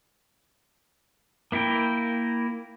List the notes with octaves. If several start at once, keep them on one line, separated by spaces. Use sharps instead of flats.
A#3 E4 A#4 G5